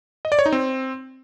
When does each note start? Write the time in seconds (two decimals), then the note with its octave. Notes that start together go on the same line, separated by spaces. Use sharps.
0.25 D#5
0.32 D5
0.39 C#5
0.46 D#4
0.52 C4